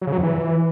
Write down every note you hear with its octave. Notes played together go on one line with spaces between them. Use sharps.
F#3
C#3
F#3
F2
E3